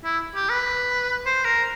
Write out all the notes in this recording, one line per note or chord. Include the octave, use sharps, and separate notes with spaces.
E4
G4
B4
C5
A#4